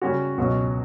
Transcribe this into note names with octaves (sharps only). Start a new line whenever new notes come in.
C#3 G3 C#4 F#4
C#2 B2 F#3 C#4 F#4